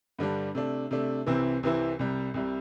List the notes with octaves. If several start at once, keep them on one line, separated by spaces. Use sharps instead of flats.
G2 D3 G3 D4
C3 A3 D4
C3 A3 D4
C2 C3 E3 C4 E4
C2 C3 E3 C4 E4
C2 C3 G3
C2 C3 G3